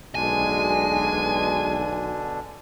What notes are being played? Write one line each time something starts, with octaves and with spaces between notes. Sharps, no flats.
B1 B2 D3 G#3 D4 G#5